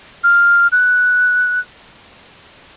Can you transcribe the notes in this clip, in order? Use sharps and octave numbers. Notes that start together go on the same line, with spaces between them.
F6
F#6